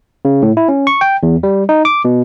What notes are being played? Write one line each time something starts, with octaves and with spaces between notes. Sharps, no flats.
C#3
A2
E4
C#4
C#6
G5
E2
G3
D#4
D6
B2